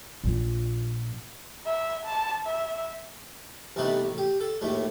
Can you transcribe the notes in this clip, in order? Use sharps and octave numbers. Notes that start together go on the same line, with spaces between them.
A#1 A#2
E5
A5
E5
G2 C3 E3 A3 B3 D#4
A1
G4
A4
A#1 D#2 A2 A3